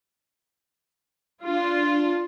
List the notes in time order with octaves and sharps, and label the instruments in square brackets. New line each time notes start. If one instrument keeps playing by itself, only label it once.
[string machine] D4 [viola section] F4